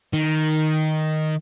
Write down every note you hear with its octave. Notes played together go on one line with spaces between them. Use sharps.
D#3